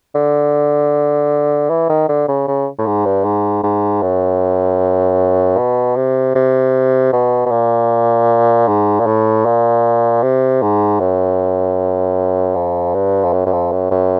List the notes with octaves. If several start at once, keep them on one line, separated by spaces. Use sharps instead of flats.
D3
E3
D#3
D3
C#3
C#3
A2
G#2
G2
G#2
G#2
F#2
B2
C3
C3
B2
B2
A#2
G#2
A#2
A2
A#2
C3
G#2
F#2
F2
G2
F2
F#2
F#2
F2
F#2
F#2